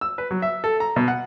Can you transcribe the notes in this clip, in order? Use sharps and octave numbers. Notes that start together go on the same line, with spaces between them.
E6
B4
F#3
E5
A4
A#5
B2
F#5